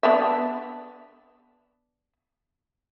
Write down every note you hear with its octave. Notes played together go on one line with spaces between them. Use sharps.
B3 D4 E5